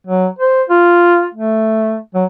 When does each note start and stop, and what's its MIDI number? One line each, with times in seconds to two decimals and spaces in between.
0.07 0.27 54
0.39 0.62 72
0.69 1.26 65
1.34 1.98 57
2.15 2.25 54